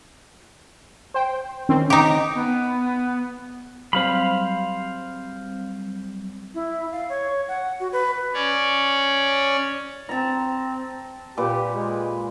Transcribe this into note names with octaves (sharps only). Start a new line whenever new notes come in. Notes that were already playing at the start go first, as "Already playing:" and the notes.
C5 G5
D#3 C4 C#4
D#4 G4
B3
F#3 G3 C4 C5 F5 B5
E4
F5
C#5
F#5
F#4
B4
C#4 C#5 D5
C4 A5 A#5
A#2 G4 B4 D6
G#3